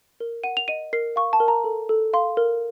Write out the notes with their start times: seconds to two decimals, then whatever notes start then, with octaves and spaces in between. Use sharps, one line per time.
0.20 A#4
0.44 F#5 D#7
0.57 F7
0.68 D#5 D#7
0.93 A#4 C7
1.16 F5 C#6
1.33 A5
1.40 A#4
1.48 A#5
1.64 A4
1.89 A4
2.13 F5 C6
2.37 A#4